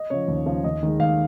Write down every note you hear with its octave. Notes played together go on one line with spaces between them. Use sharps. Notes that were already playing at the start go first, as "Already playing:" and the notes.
Already playing: D#5
C#3 F3 C#5
D#2
C#3 F3
D#2 D#5
D#3 G#3
D#2 F5